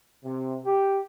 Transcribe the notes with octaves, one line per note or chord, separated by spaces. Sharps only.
C3
G4